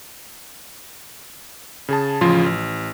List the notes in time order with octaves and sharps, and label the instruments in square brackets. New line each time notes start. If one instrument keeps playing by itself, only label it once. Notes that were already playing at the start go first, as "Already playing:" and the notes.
[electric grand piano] C#3 G#4 A5
A1 C#3 F3 F4 C6
A1